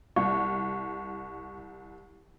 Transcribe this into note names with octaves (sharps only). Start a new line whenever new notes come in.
C2 C#6